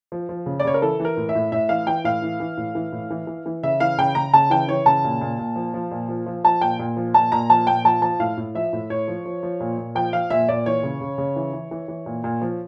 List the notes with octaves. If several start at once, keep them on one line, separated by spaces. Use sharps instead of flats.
F3
F3
C#3
D5
C#3 C#5
A#4
E3 A4
E3
A#4
A2
E5
A2
A2 E5
E3 F5
E3 G5
A2 F5
E3
E3
A2
E3
A2
E3
E3
E3
C#3 E5
E3 F5
C#3 G5
C#3 A#5
C#3 A5
E3 G5
E3 C#5
C#3 A5
A#2
A#2
A#2
F3
F3
A#2
F3
F3
F3 A5
A#2 G5
A#2
F3
A#2 A5
A#2 A#5
F3 A5
A#2 G5
F3 A5
F3 A5
A2 F5
A2
F3 E5
A2
A2 C#5
F3
F3
F3
A#2
A#2
F3 G5
F3 F5
A#2 E5
A#2 D5
E3 C#5
C#3
C#3
C#3
E3
E3
E3
E3
A#2
A#2
F3